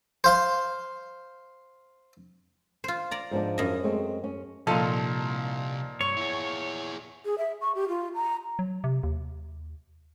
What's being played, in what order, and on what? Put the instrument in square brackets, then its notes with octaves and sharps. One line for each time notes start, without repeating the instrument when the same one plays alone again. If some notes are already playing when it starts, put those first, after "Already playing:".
[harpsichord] C5 F5 C6
[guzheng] F4 C5
D5 A#5
[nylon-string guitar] G#2 F3 D4
[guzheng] F#2 D#5
[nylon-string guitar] G#3 A3 C4
C#4
[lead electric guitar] C2 [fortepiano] A#2 F3 [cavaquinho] D#4 A4 C6
[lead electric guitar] G2 [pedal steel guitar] C#5 [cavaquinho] C#6
[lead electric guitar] E4 G#4
[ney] G#4
E5
C#6
G4
F4
A#5
[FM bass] F#3
C3
D#2